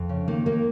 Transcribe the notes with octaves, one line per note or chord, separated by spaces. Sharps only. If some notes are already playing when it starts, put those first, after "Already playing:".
Already playing: F2
C#3
D#3 A#3
D#3 A#3